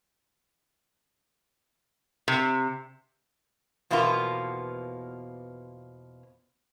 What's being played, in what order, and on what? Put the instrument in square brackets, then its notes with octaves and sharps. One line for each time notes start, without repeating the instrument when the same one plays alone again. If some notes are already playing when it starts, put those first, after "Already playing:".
[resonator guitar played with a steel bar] C3
E2 B2 F3 A#3 B3 F4